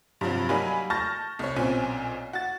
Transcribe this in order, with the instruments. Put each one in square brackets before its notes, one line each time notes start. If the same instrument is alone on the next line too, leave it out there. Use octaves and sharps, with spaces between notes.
[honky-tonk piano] G2 C3 F3 F#3
F#3 G3 A#3 D#4 G#5 B5
A5 C#6 F6 G6 A6 A#6
C2 C#5
B1 A#2 C4 C#4 G#5
F#4 A6